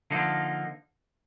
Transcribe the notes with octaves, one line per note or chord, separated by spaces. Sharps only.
D3 F3 A#3 D#4